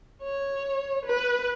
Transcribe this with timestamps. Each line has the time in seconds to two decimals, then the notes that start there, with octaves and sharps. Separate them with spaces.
0.23 C#5
1.06 B4